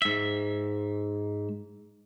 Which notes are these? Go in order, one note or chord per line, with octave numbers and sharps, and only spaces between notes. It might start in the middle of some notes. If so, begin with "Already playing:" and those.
G#2 E5